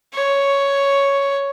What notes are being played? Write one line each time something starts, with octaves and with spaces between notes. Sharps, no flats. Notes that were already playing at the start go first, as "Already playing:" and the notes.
C#5